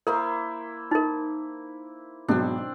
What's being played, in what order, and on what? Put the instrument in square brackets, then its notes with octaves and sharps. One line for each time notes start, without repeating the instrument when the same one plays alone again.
[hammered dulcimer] A#3 E4 C5 [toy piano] A#4
[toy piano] D#4 A#4
[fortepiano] G#1 B2 F#3 [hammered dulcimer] C4 D4